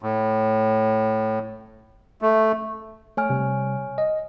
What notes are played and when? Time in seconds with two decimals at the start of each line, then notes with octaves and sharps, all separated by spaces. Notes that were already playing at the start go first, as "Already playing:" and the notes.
0.03 A2
2.22 A3
3.17 A3 C#5 G#5 F6
3.30 C3 G3
3.98 D#5